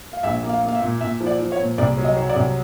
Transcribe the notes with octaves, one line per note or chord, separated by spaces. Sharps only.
F5
A#1 E5
A#3
F5
A#3
F5
E5
A#2
A#2 E5
F3
D5
F3
C#5
A#2
C2 D5
F#3
D#5
F#3
D5
C2